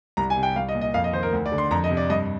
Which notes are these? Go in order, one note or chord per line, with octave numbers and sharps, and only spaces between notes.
C2 A#5
G#5
C3
G5
C2 F5
D#5
A#2
D#5
F2 F5
D#5
D#3 C5
A#4
D2
D5
D3
C6
F2 A#5
D#5
C3
D5
G2 D#5